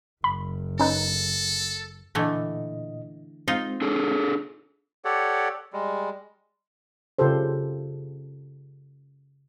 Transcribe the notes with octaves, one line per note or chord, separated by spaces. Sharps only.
F#1 B5
C#4 D#4 A4 B4
A#2 D3 E3 A3 D#5
G#3 C4 D#4 F4
D4 G#4 A4
G4 A4 C#5 D5 F#5
G3 G#3
C#3 F4 G4 A4 C5